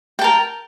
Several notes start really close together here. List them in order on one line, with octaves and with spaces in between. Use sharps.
G5 A5 A#4